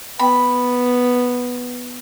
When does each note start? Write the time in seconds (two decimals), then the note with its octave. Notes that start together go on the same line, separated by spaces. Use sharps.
0.19 B3 B5